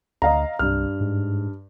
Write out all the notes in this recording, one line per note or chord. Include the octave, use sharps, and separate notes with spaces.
D2 D#5 F5 A#5
C2 G2 F6
G#2